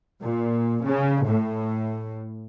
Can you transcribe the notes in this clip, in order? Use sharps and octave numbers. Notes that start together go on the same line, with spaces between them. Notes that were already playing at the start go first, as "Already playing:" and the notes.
A#2
C#3
A2